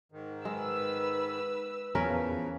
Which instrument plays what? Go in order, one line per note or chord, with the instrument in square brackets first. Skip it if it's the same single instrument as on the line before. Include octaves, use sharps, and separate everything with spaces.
[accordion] G#2 D#3
[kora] G#3 [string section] B4 E6
[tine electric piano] E2 [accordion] C#3 E3 F3 [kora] C#4 A#4 B4